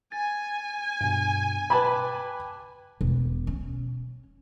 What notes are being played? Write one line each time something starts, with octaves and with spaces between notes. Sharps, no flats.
G#5 A6
G2 B2
B4 G5 A5 B5 D6
E1
C#4